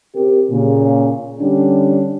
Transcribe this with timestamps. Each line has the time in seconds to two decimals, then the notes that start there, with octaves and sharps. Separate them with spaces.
0.15 C3 G4 A#4
0.50 A#2 C#3
1.40 D3 G3 C#4 D4